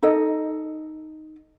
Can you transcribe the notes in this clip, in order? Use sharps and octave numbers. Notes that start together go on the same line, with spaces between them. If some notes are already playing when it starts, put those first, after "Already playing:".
D#4 A4 D#5